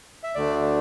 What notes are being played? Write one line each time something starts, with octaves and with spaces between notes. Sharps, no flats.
E5
D2 D3 A3 D4 D5